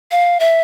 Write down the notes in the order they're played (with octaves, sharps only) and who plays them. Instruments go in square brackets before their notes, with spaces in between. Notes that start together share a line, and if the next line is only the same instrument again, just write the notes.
[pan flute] F5
E5